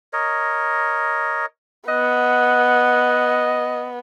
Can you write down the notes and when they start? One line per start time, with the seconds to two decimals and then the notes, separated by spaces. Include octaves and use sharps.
0.13 A#4 C#5 D#5
1.88 B3 D#5 F#5